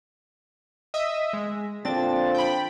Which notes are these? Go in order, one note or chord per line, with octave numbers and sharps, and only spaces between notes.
D#5 E5
G#3
A#2 D3 F3 C4 D4 A6
G5 B5